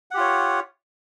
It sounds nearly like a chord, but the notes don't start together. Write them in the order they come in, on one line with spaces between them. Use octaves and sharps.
F#5 G4 F4 C#5